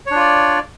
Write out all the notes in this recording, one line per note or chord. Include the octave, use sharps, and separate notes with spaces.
D4 F4 C#5 D5